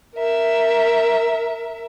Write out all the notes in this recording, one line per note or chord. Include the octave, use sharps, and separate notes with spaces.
A#4 E5